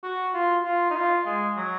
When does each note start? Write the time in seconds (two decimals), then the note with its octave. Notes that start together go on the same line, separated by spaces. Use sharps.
0.04 F#4
0.34 F4
0.65 F4
0.90 D#4
0.95 F4
1.26 G#3
1.56 F#3